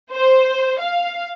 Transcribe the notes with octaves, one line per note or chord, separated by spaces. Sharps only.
C5
F5